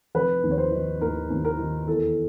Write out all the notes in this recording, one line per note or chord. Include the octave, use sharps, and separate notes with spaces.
F1 B4
D#2
C#5
C5
D#3
D#2 A#4
D#2
A#4
D#3
E2 A4